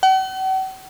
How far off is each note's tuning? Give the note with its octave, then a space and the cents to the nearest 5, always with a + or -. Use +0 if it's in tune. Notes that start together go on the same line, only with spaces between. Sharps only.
F#5 +45